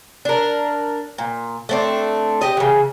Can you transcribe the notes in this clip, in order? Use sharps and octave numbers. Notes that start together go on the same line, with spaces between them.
D4 A#4
A#2
A3 C4 D4
G4 D#5
C#3 E3